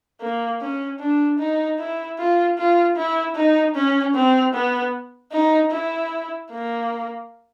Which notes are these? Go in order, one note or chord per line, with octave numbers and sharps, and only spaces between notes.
A#3
C#4
D4
D#4
E4
F4
F4
E4
D#4
C#4
C4
B3
D#4
E4
A#3